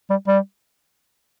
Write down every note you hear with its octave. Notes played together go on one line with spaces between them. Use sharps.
G3
G3